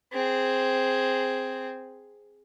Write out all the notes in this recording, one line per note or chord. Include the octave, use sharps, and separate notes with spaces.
C4 G#4